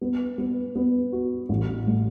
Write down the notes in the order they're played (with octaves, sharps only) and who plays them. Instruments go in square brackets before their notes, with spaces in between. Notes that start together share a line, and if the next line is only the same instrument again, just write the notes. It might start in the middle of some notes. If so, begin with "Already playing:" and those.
[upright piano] B3
B3
B3
F#4
A1
A2